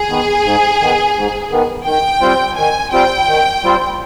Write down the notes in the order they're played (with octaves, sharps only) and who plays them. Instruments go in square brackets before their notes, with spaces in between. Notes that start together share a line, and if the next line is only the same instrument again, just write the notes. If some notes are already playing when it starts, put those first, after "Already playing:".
Already playing: [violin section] G#4
[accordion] D#3 B3
G#2
D#3 B3
G#2
D#3 B3
[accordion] D#3 [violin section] G5
[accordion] G3 C4 F4 C5
[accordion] D#3 [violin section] G#5
[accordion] G3 C4 F4 C5 [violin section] G5
[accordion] D#3
G3 C4 F4 C5